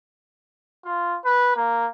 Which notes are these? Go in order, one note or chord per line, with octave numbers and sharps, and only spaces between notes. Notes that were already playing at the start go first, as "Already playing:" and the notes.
F4
B4
A#3